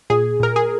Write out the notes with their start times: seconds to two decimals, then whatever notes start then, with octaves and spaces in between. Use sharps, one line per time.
0.10 A#2 G#4
0.40 A#2 A#4
0.56 G#4